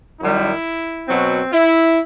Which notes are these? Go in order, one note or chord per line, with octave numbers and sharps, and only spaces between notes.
F#2 D#3 G3 E4
B2 F#3 C4
E4